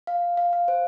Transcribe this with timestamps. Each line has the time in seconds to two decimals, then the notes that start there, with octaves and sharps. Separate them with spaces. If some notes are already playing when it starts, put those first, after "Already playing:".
0.07 F5
0.37 F5
0.53 F5
0.68 C5